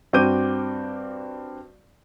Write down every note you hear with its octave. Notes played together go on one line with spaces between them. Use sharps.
G2 C4 F#4 D6 G6 D#7